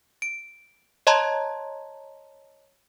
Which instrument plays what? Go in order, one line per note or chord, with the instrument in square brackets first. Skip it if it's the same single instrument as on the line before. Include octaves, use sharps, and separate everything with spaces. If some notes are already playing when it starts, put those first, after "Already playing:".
[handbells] D7
C#5 D#5 A5 A#5 C6 G#6